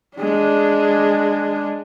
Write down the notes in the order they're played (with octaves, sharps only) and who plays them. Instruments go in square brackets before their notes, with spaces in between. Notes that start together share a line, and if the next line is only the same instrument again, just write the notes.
[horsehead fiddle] G#3 D4